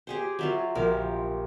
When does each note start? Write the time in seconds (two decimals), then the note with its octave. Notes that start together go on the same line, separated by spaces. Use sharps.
0.07 G4 G#4 C5
0.39 F#3 E4 F4
0.75 A#1 A#3 G4 A#4